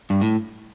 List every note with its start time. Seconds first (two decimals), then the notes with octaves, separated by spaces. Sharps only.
0.10 G2
0.21 A2